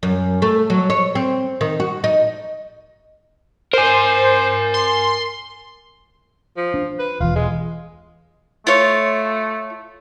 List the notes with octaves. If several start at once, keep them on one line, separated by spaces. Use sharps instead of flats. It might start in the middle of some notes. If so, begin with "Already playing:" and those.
F#2
A3
F#3
C#5
C4
D#3
F#4
D#4
A#4 C5 G#5
C6
F3
D4
B4
E1 E2 F4
G#3
A3 F4 C#5